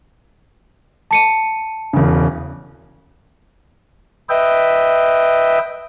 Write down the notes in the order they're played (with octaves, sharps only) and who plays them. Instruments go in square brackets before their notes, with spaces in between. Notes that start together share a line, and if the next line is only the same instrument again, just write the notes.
[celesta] A5 C#7 D#7
[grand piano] E1 C#3
[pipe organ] B4 D#5 E5 G5